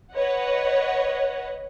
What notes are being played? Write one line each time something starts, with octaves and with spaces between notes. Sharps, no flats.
B4 C#5 D#5 F#5